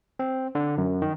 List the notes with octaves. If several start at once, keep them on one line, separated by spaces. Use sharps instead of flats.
C4
D3
F#2
D#3